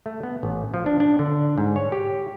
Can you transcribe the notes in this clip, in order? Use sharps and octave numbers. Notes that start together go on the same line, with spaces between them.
A3
B3
A1
F3
D4
D4
D3
G#2
C#5
G4